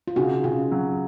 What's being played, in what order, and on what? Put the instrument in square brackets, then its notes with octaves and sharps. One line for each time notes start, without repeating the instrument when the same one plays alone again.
[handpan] F4
[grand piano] C#3 [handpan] D#4 F#4
[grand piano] C#3 [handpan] C#4 F4
[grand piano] F#3